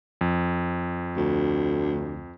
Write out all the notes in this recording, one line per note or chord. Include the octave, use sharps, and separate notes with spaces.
F2
D2